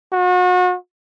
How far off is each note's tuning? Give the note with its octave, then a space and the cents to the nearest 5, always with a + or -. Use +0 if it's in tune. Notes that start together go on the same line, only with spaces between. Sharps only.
F#4 -35